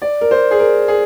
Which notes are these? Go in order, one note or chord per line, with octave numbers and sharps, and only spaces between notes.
D5
A#4
C5
G#4
A#4
G#4